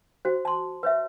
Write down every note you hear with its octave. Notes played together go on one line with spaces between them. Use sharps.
F#4 C5
A5 C6
B4 C#5 E5